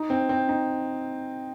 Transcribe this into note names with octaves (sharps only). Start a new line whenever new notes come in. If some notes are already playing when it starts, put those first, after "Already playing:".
Already playing: D#4
C4
C4
D#4